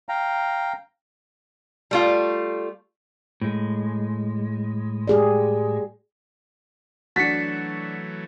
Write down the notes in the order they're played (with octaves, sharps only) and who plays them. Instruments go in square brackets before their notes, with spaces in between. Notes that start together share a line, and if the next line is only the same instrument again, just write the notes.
[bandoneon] F5 G5 A#5
[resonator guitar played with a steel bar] G3 A3 F4
[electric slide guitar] A2 G#3
[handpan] G4 G#4 D5
[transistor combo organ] E3 F#3 A3 [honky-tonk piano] D4 F#4 [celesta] A6 C#7 [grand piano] B6